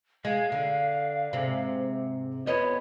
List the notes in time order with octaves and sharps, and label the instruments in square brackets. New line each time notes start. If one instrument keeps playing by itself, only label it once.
[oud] G#3 [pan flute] F5
[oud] D3
G#2 C3
[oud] F2 B3 D#5 [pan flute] C#5